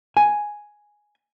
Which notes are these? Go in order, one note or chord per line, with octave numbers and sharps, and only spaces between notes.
G#5